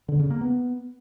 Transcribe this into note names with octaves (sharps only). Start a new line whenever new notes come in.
D3
C#3
A#3
B3